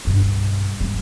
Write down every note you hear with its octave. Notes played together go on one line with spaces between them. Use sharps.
B1 G2
A1 G3